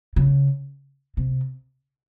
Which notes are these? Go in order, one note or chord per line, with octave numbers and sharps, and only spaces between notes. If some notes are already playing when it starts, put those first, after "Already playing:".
C#3
C3